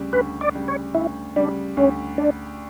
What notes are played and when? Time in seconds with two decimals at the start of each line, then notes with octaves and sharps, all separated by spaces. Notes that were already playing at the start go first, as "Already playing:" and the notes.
Already playing: D2 C#3 G3
0.13 D2 B4
0.41 D5
0.55 C#3 G3
0.68 C#5
0.95 D2 E4
1.36 C#3 G3 D4
1.77 D2 C#4
2.18 D4